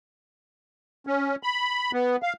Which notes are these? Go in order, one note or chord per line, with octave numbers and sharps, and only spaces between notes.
C#4
B5
B3
F5